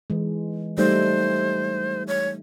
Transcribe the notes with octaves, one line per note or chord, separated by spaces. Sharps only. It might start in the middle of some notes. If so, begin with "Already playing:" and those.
E3 G#3
G3 A3 D#4 C5
C#5